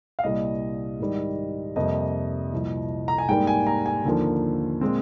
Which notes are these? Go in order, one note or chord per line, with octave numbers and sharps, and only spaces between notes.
F5
C2 A#2 G3 D#5
G#2 D#3 G3
F2 C3 G3 A#3 D#5
C2 A#2 F3
A#5
G#5
G#2 G3 A#3 G5
G#5
A#5
G#5
D#2 D3 F3 A#3
A#2 G#3 C4